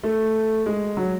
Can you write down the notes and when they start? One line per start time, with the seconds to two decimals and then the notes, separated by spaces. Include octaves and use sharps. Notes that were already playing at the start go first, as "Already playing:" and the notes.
0.03 A3
0.66 G#3
0.97 F#3